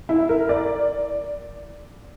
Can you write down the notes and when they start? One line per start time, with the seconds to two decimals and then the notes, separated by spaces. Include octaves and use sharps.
0.09 E4
0.29 A#4
0.49 D5